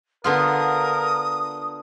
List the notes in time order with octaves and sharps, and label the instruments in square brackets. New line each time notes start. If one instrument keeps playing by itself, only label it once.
[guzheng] D3 B3 F4 [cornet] A#4 [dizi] D#6